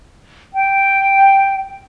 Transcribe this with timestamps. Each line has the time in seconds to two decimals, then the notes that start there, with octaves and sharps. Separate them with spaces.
0.54 G5